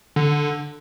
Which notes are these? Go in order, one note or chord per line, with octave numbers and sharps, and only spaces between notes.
D3